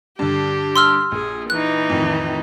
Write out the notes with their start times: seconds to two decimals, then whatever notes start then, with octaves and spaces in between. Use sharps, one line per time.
0.19 G2 D3 G4
0.76 C6 E6 F6
1.12 A#1 G#4
1.50 E3 D#4 F#6
1.90 F2 A2 D#3